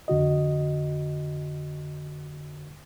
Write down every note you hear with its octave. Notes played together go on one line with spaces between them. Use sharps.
F2 D3 F#4 D#5